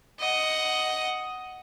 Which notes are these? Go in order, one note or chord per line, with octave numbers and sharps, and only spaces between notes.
D#5 F#5